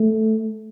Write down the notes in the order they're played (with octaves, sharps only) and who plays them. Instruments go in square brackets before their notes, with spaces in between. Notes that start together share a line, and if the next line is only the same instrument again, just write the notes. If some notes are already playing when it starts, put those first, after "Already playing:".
Already playing: [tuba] A3